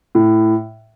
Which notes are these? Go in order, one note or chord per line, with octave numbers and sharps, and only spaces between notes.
A2